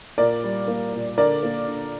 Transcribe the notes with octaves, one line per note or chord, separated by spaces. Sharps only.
A#2 A#4 D5
G3
A#3
A#2
D3 A#4 D5
A#3
D3